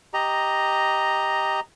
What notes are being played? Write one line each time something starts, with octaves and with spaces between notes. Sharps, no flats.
G4 D#5 A#5